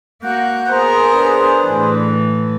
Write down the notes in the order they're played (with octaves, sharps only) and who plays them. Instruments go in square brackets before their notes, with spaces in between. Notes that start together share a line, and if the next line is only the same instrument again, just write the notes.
[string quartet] A#3 F#4 [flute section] F#5 F#6 G6
[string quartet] B3 A#4 A#5 [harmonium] G#4 C5
[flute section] D4 B4
[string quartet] A2 E3